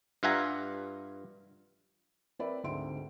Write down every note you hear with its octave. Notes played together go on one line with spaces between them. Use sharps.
G2 F4 E5 F#5 G#5 A#5
C4 A#4 B4 D5 E5 B5
D2 G#2 C4 E5 C6 D7